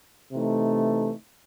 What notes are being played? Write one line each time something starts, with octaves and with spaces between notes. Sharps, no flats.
C3 E3 A3 D#4